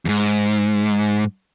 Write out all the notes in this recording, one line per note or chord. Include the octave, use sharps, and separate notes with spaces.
E2 G#2